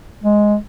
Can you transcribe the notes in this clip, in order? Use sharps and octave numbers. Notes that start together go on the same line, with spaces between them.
G#3